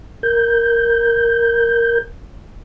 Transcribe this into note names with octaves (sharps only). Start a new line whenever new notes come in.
A#4 G6